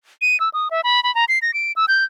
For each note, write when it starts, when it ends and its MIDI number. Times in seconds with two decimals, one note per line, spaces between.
0.21 0.39 99
0.40 0.49 88
0.54 0.68 87
0.71 0.81 76
0.84 1.03 83
1.03 1.14 83
1.15 1.25 82
1.28 1.39 96
1.42 1.54 94
1.54 1.72 98
1.76 1.86 88
1.88 2.04 91